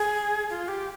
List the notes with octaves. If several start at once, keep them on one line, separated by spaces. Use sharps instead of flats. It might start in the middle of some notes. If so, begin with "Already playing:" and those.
Already playing: G#4
F4
G4